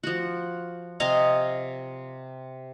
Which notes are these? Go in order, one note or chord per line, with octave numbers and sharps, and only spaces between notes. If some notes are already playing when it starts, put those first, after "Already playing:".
F3 F#4
C3 D#5 F5 G#5